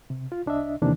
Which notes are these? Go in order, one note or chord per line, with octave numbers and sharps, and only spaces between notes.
C3
F4
C2 D4 D#5 E5
E2 C3 D#3 E3 A#3 D4